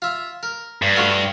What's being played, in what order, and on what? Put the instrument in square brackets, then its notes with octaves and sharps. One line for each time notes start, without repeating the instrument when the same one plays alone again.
[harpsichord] F4 E5
A#4
[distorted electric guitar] G2
[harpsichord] A3 F4 F#4